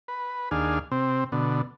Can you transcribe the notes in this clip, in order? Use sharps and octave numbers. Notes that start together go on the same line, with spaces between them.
B4
D#2 D4 G#4 F5
C3 C4
B2 D3